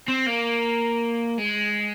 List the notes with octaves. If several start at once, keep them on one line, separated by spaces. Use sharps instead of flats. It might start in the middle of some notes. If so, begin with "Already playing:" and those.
C4
A#3
G#3